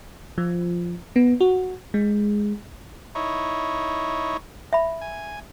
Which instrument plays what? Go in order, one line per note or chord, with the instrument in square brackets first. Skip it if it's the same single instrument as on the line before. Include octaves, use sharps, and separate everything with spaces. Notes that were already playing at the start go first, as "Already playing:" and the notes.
[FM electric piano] F3
B3
F#4
G#3
[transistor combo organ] D#4 E4 C#5
[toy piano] E5 B5
[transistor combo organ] G#5